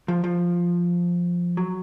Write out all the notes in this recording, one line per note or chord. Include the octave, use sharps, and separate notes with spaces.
F3
F3
F#3